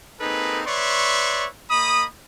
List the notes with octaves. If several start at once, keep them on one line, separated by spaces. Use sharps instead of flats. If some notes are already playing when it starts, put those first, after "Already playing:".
A#3 C4 D#4 G#4 A4 B4
B4 C#5 D5 E5 C6 C#6
A#3 D#5 B5 D#6